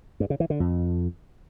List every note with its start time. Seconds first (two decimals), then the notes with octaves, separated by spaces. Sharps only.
0.20 G2
0.30 C#3
0.40 E3
0.50 D3
0.60 F2